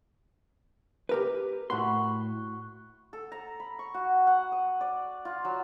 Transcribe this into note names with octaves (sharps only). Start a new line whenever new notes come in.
G4 A#4 B4
A2 F#4 B5 C6
A4
A#5
B5
C#6
F#4
F#5
D#6
D5
F4
F#3